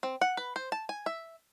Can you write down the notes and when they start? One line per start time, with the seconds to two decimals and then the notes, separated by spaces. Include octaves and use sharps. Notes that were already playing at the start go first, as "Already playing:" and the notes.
0.03 C4
0.21 F#5
0.37 B4
0.56 C5
0.72 A5
0.89 G#5
1.06 E5